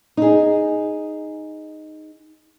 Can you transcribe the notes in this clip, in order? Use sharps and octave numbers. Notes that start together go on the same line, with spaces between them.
D#4 G#4